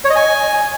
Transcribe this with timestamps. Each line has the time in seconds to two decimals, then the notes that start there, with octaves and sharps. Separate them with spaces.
0.05 C#5
0.10 D#5
0.16 G#5